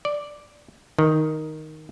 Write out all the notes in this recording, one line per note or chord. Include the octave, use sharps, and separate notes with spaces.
D5
D#3